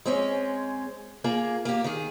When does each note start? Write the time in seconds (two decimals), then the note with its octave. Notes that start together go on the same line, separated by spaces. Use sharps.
0.06 G#3 C4 C#4
1.24 A#3 F4 G#4 A#4
1.65 A#3 G4
1.84 D#3 G#4